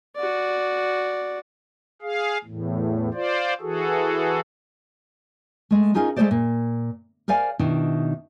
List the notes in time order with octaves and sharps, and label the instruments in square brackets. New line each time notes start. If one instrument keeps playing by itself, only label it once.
[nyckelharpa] F#4 D5
[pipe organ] G#4 F5
E2 A2
F4 C5 D5
E3 F#4 G#4 A4
[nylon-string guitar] G#3 A3
C#4 D#4 F4 G#4 A#4 D#5
G#3 A3 B3 G#4 C5 D5
A#2
A#4 C5 D5 F5 G#5
B2 D#3 D4 E4 G5